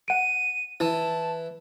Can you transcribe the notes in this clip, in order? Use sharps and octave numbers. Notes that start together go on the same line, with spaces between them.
F#5 D7 D#7
E3 E4 A5